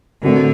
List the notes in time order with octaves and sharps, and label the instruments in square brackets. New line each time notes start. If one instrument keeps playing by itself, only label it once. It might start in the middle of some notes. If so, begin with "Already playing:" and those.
[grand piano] A2 A3 C4 F#4 A#4 [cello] D3